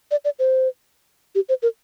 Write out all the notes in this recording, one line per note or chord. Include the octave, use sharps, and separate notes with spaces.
D5
D5
C5
G4
C5
A#4